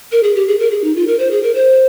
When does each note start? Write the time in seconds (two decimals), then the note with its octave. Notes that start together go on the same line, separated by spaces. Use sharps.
0.12 A#4
0.23 G#4
0.35 G4
0.48 G#4
0.59 A#4
0.71 G#4
0.84 D#4
0.96 F4
1.07 A#4
1.19 C5
1.31 G#4
1.43 A#4
1.55 C5